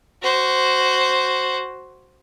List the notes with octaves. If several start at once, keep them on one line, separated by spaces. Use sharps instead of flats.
F#4 C5